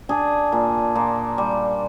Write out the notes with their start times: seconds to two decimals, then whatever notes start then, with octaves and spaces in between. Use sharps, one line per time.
0.09 D4 G#4
0.52 A#2
0.95 A#2
1.38 G3